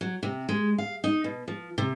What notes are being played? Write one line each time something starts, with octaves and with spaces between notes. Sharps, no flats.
F#3
C3
G#3
F5
D#4
B2
F3
C3